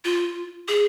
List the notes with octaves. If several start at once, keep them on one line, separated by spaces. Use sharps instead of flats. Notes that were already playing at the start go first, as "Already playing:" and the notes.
F4
G#4